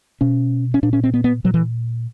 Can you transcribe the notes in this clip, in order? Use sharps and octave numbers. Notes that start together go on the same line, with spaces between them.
B2 C#4
C#4
A#2 D4
C#4
C4
B3
B3
A#2 F#3
E3